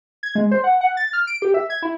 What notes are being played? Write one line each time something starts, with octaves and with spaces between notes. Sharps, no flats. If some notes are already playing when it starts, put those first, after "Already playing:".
G#6
G#3
C5
F#5
F#5
A6
F6
D7
G4
E5
G#6
E4